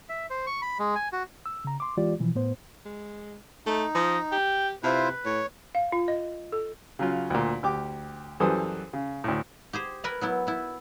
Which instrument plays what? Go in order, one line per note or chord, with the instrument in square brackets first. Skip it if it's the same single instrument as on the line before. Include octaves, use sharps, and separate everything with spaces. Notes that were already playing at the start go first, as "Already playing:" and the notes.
[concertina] E5
C5
C#6
B5
G#3
G#5
F#4
[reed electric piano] E6
C#3 A#5
C6 D6
E3 G#3 F4 G4 D5
B2 E3 F3
A2 B3 C5
[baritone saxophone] G#3
[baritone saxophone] A3 [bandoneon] D#4
[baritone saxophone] F3 [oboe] D#5
[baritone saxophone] G4 [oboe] G5
[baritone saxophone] C3 [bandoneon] E4 F4 C5 [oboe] B4
[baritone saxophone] A2 [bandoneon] C#5
[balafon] F5
F4
D#5
A4
[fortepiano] C#3 F#3 F4
D2 A#2
D2 G4 D6
F#2 E3 G3 A4 C5 D#6
C#3
D2 A2
[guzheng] G4 G#4 C5
A#4 B4 G#5 A#5 B5
F#3 B3 E4
B3 E4